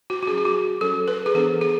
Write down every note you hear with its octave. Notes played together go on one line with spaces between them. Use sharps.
F#4
F#4
F#3 C#4 G#4
G#4
F#4
F#3 C#4 A4
B4
G#4
E3 B3 D4 A4
G#4